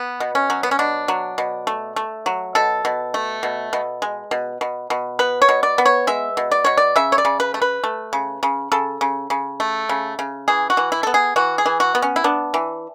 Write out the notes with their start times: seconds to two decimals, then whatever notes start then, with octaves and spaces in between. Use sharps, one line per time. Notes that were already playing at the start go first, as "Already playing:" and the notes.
Already playing: B3
0.20 B2
0.35 C#4
0.50 F#3
0.63 B3
0.71 C#4
0.79 B2 D4
1.08 F#3
1.38 B2
1.67 A3
1.96 A3
2.26 F#3
2.55 B2 A4
2.85 B2
3.14 A3
3.43 B2
3.73 B2
4.02 G#3
4.31 B2
4.61 B2
4.90 B2
5.19 B3 B4
5.42 C#5
5.49 B2
5.63 D5
5.78 B3
5.85 C#5
6.07 G#3 E5
6.37 B2
6.51 D5
6.64 B2 C#5
6.77 D5
6.96 C#3 E5
7.12 C#5
7.18 D5
7.25 C#3
7.40 B4
7.54 A3
7.62 B4
7.84 A3
8.13 C#3
8.43 C#3
8.72 C#3 A4
9.01 C#3
9.30 C#3
9.60 A3
9.89 C#3
10.19 C#3
10.48 E3 G#4
10.70 F#4
10.77 E3
10.92 E4
11.03 B3 A4
11.14 G#4
11.36 E3 F#4
11.58 G#4
11.66 E3
11.80 F#4
11.95 B3
12.02 C#4
12.16 E4
12.24 B3 D4
12.54 E3